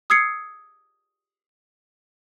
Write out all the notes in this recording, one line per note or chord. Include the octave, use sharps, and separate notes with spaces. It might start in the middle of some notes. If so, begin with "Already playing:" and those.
D#6 E6 G#6 C7 C#7